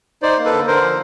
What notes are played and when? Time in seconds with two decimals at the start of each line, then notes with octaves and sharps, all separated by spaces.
0.22 D#4 C5 D5
0.38 A#3
0.45 A4 B4
0.52 D3
0.67 D3 A#4 C5
0.82 F3